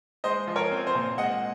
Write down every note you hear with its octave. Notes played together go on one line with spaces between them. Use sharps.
G#3 C5 D#5
F3
A#4 C#5
C4
C5
A#2
G#3 D#5 F#5